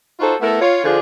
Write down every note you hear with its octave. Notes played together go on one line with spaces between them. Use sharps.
D#4 F4 F#4 A4 C5
A3 B3 E4 A4 A#4
F4 C#5
D3 F3 D4 F4 G#4